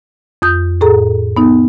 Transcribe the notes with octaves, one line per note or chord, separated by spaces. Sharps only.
F2 D#6 G6
A2 G#4 A4 A#5
B3 D#4